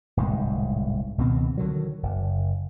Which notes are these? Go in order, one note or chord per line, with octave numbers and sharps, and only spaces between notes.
D1 C2 G#2 G#3
C#2 B2 D#3 C4
D3 D#3 F#3
F#1